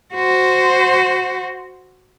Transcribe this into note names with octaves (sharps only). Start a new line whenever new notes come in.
F#4 C5